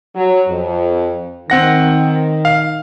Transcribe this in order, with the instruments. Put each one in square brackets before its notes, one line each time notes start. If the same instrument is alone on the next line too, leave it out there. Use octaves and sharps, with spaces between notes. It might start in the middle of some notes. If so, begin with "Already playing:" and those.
[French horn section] F#3
F2
[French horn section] D#3 [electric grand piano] C4 F#5 A#6
[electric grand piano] F5